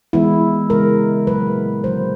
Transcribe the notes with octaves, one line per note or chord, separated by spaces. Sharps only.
E3 G#3 B3 E4
C#3 E3 G#3 A#4
A#2 F#3 A#3 B4
D3 F#3 A#3 C5